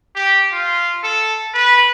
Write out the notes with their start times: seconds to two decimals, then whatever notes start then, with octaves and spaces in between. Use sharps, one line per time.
0.15 G4
0.52 F4
1.04 A4
1.54 B4